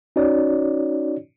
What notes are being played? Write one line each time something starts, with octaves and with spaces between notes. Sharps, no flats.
C#4 D#4 F#4 C#5 D5